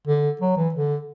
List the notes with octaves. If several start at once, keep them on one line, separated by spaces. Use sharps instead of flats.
D3
F#3
E3
D3